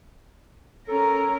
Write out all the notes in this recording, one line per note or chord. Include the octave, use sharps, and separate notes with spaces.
C#4 A4 A#4 A#5